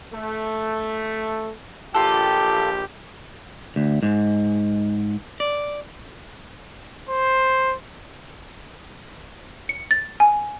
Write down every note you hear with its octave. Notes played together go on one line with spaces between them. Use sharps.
A3
A#1 F4 G4 A4
D2
G#2
D5
C5
C#7
A6
G#5